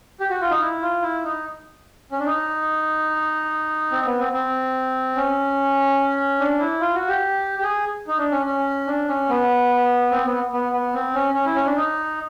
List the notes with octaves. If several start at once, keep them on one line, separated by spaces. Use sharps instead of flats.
G4
F#4
F4
D#4
E4
F4
E4
D#4
C#4
D4
D#4
C4
B3
C4
C4
C#4
D4
E4
F4
F#4
G4
G4
G#4
D#4
D4
C#4
C#4
D4
C#4
B3
C4
B3
B3
B3
C4
C#4
C#4
E4
C#4
D4
D#4